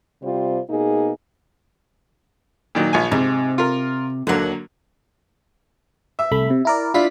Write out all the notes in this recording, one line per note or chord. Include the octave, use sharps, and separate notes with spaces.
C3 G3 F4 C5
B2 A#3 D#4 G#4
A#2 D#3 F#3
A#1 G#5
G#2 C3
F4 A#4
D#2 D3 F#3 A#3 F#5
E5
C2 A3 B5
C3
E4 A#4 D5
D4 E4 F4 B6